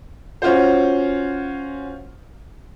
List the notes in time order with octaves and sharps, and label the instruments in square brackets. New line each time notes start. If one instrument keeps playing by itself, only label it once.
[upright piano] C#4 F4 F#4 C5